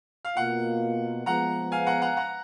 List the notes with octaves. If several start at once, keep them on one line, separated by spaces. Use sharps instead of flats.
F5
B2 A#3 F4 F#5
F3 G#3 B3 F#5 A#5
F5 G#5
F#5 A#5
F#5 A#5
F#5 A#5